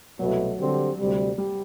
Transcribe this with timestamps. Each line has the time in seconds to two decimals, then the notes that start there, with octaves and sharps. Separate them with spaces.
0.19 C2 B2 F#3 A3
0.58 D3 G3 C4 G4
0.99 D2 C3 G3
1.38 G3